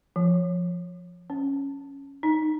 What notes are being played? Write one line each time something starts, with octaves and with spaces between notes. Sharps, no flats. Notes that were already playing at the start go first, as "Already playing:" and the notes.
F3
C#4
D#4